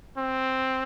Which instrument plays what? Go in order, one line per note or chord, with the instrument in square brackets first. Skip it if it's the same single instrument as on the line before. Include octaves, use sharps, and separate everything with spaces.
[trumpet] C4